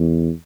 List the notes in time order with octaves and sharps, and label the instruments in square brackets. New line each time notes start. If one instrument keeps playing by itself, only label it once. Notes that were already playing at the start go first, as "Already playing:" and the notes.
Already playing: [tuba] E2